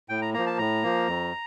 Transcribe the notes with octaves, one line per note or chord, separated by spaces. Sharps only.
A2 G5
A#5
F3 A#3 A#5
A5
A2 A#5
F3 A#3
F2